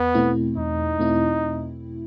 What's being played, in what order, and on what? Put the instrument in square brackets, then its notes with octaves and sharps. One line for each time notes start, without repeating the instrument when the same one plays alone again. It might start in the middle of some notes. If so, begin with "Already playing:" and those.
Already playing: [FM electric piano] E2 [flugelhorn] B3
[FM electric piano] B2 A3 C4 E4
[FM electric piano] E2 [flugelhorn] D#4
[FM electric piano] B2 A3 C4 E4